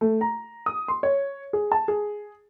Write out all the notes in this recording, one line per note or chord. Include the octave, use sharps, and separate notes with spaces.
A3
A#5
D#6
C6
C#5
G#4
A5
G#4